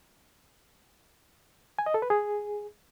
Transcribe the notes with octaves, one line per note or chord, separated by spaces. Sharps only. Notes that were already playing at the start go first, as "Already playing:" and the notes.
G#5
D#5
A4
B4
G#4